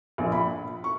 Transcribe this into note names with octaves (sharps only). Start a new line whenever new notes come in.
A#1
B5
C#6